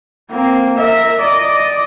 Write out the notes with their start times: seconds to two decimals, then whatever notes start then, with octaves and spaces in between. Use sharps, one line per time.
0.30 A#3 C4
0.77 A#4 E5
1.18 D5 D#5